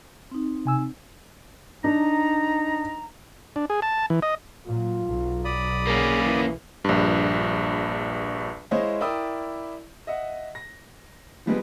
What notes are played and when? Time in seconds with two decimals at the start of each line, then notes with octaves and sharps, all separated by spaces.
0.31 C4 D#4
0.65 C3 G#5 E6
1.84 D4 D#4 A#5
3.56 D4
3.70 G#4
3.82 A5
4.10 E3
4.22 D#5
4.67 A#2 F#3 F4
5.06 B1 F#3
5.45 D5 B5 D#6
5.87 A#3 C#4 G#4
6.24 E3
6.84 A#1 G2
8.71 G#3 E4 C5 C#5 D#5 F5
9.01 E4 A#4 D5 G5 D#6 E6
10.07 D#5 E5 F#5
10.55 A#6
11.46 F3 G3 G#3 B3